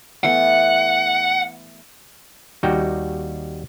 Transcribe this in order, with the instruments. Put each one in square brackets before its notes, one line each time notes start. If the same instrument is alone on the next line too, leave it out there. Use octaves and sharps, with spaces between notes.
[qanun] E3 A3 B3 [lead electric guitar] F#5
[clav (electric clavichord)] D#2 G3 D#4 F#4 G5